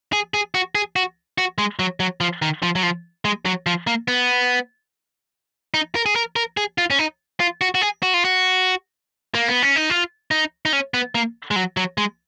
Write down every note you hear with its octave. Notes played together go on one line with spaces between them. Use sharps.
G#4
G#4
F#4
G#4
F#4
F#4
G#3
F#3
F#3
F3
D#3
F3
F#3
F3
G#3
F#3
F3
A#3
B3
D#4
A#4
G#4
A#4
A#4
G#4
F4
C#4
D#4
F4
F#4
F#4
G#4
F#4
F4
F#4
A#3
B3
C#4
D#4
F4
D#4
D#4
C#4
B3
A#3
G#3
F#3
F#3
G#3